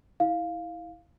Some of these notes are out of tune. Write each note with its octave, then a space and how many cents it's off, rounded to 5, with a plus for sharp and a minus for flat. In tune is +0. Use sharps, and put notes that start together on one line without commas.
E4 -20 F5 +0